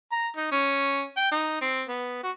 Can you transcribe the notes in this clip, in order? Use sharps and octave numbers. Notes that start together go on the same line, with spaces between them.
A#5
D#4
C#4
G5
D#4
C4
B3
F#4